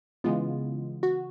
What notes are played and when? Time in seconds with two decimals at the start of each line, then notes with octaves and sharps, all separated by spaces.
0.24 C#3 E3 G#3 B3 F4
1.03 F#4